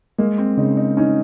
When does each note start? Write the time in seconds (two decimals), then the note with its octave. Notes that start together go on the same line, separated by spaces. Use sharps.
0.18 G#3 A#3
0.38 C4
0.57 C#3 D#4
0.77 D#4
0.97 C#4 D#4